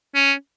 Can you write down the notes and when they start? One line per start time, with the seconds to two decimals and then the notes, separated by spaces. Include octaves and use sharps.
0.15 C#4